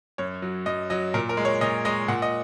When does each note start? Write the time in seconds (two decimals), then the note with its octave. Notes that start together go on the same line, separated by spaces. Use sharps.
0.18 F#2 C#5
0.42 F#3
0.66 F#2 D#5
0.90 F#3 D#5
1.14 A#2 A#4
1.29 A#4
1.37 G#3
1.45 C#5
1.61 A#2 D#5
1.85 G#3 D#5
2.08 A#2 F#5
2.22 D#5